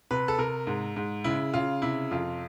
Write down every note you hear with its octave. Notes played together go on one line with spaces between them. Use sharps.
C3 B4
A4
C3 A#4
G#2
G#2
C#3 E4
C#3 F4
C3 E4
F2 F4